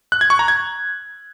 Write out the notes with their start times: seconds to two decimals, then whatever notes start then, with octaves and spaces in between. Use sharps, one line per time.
0.12 F#6
0.21 G#6
0.30 C#6
0.39 A#5
0.48 G#6